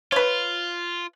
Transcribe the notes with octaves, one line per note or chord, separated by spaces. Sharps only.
F4 B4 C#5